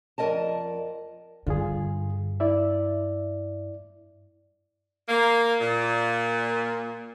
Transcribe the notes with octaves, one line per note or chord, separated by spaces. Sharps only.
F2 G#2 A#4 D5 D#5 A5
G2 D3 F4 G#4
E4 D5 E5
A#3
A#2